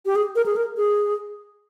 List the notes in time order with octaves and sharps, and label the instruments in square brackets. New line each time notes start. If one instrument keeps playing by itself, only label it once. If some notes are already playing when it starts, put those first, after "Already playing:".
[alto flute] G4
G#4
A#4
G#4
A#4
G#4